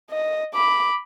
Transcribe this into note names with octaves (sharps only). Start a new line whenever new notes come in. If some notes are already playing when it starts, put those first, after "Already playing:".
D#5
B5 D6